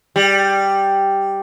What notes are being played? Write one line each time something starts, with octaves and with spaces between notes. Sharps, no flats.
G3